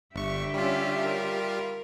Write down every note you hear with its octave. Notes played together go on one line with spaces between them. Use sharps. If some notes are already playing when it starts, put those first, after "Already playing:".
G1 D3 G4 E5 C#6
G3 C#4 F4
A#4